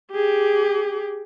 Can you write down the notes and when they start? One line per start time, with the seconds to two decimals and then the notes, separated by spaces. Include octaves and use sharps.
0.12 G4 G#4